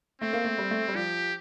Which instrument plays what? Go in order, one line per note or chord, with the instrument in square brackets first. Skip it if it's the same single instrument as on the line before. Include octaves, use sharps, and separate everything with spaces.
[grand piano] A3 [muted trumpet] C4
[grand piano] A#3
A3
G3
A3
G3
[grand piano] F3 [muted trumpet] G4